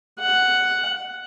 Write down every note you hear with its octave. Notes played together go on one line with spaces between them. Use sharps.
F#5